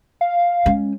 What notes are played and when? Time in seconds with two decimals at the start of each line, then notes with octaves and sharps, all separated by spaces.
0.21 F5
0.66 G#3 C#4